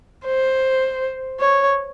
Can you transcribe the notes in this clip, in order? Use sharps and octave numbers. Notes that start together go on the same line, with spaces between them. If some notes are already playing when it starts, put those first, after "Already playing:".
C5
C#5